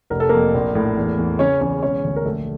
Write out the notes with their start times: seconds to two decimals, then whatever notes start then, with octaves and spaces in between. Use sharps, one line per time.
0.10 F1 A#4
0.20 A4
0.29 F2 A#3 A#4
0.54 A#1
0.75 A2
0.97 E2
1.18 E2
1.39 C#3 C#4 C#5
1.61 E2 C#4 C#5
1.83 E1 C#4 C#5
2.05 D2
2.16 A#4
2.25 A#1 A3 A4